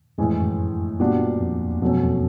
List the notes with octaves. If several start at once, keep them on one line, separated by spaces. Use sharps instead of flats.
F2 A2 E3 G#3
F#2
A#2 G3 B3 D4 F#4
F2
E2
F2 B2 F#3 A3 C#4
E2